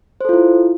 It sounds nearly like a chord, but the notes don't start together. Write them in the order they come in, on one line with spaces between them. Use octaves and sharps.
C5 A4 F4 E4